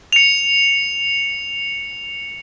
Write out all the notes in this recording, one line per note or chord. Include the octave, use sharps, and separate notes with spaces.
C#7 F7